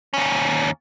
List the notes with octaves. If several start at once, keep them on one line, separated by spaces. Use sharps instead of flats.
D#2 C#4